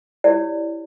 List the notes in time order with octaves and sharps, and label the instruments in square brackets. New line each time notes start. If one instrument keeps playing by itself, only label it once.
[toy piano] E4 G4 C#5 D5